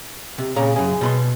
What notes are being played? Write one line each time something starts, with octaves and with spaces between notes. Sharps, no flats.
C3
A#2 C#3 A#5
F#2 C#3 G#4
B2 B5 C6